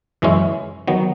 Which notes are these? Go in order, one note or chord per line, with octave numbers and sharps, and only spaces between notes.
F#2 E3 G#3 C#4 E4
D#3 F#3 B3